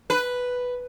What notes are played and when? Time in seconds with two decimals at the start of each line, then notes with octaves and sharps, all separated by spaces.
0.10 B4